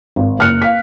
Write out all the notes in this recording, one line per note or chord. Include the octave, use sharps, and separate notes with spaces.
G#1
F#1 F6 F#6 C#7
F5 B6